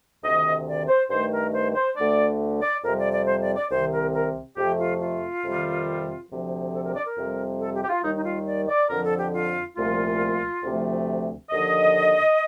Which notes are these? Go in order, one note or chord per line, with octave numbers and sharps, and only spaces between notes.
D2 C3 D#3 D#5
D5
C5
G2 D#3 A3 C5
A#4
C5
C5
D2 D3 A3 D5
D5
F2 C3 G3 A#4
D5
D5
C5
D5
D5
C2 C3 D#3 C5
A#4
A#4
F2 C3 F3 A3 G4
F4
F4
F2 C3 D#3 G3
D2 C3 F3
A4
A#4
D5
A#4
F2 C3 G3
A4
G4
G4
F4
D#2 D#3 G3 D#4
D#4
F4
D5
D5
F2 D3 F3 A#4
A4
G4
F4
C2 A#2 F3 A3 F4
D2 C3 F3 A3
D#2 D3 F3 D#5